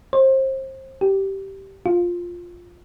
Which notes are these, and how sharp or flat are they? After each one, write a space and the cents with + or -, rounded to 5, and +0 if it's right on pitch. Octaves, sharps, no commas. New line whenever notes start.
C5 +30
G4 -15
F4 +5